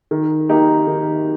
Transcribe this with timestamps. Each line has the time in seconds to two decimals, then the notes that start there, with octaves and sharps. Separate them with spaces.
0.11 D#3
0.49 A#3 D#4 G4
0.87 D#3